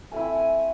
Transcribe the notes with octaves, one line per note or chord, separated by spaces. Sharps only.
A3 C4 E4 G#5
G#5